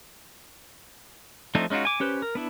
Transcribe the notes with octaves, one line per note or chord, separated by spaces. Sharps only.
F3 A3 C4 D4 D#4
G#3 C#4 D#4 F4 F#4
G#5 D6
C#4 G4 B4 C5
A#4
B3 D4 E4